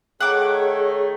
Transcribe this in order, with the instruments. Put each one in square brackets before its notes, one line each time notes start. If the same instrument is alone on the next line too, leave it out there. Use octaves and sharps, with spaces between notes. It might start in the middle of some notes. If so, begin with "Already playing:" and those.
[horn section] D#3 A3 [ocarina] G#4 [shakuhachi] C#5 [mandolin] F#5 D6